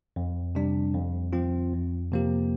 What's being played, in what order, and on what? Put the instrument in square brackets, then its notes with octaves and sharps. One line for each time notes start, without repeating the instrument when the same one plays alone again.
[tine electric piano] F2
C3 G3 D4
F2
F3 C4 F4
F2
C3 F3 A#3 G4